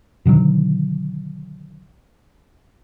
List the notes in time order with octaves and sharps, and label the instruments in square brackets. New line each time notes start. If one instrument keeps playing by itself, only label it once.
[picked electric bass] B2 D3 D#3 F#3